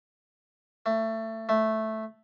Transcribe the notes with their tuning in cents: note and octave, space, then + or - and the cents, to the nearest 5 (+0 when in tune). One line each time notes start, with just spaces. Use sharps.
A3 +20
A3 -5